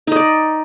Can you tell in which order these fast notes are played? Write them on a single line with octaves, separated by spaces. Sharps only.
D#4 D#5 D5